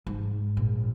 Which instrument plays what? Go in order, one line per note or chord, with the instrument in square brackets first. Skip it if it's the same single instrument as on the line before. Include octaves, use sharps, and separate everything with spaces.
[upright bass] G#2
A#1